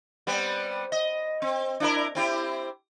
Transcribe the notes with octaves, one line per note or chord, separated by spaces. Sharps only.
G3 B3 C4
D#5
C4
D4 E4 A#4
C4 E4 G4